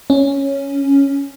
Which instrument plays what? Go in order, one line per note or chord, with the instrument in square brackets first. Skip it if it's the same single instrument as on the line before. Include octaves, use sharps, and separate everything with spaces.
[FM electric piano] C#4